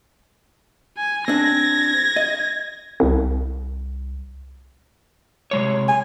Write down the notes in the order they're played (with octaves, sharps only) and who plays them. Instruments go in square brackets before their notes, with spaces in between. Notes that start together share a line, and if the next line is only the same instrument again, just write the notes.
[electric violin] G#5
[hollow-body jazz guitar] C4 D4 [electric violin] G#6 A#6
[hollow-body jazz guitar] D#5
[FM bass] C2
[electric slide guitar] C3 G#3 C#5
[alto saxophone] G#5